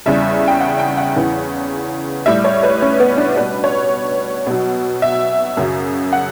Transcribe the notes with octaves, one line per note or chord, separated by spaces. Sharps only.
E2 C#3 G3 E5
G5
F#5
G5
F#5
E2 C#3 E3
A2 G3 E5
C#5
B4
C#4
B3
D4
B2 G3 B4
C#5
B2 F#3
E5
F#2 C#3 F#3
F#5